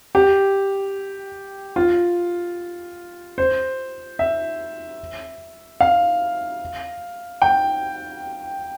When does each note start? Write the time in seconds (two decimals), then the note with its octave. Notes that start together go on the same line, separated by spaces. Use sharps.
0.15 G4
1.76 F4
3.38 C5
4.19 E5
5.81 F5
7.42 G5